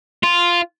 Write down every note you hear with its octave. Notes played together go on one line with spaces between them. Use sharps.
F4